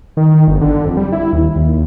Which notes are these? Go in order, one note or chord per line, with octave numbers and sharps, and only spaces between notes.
D#3
G1
D3
F2
G3
E4
D#2
D#2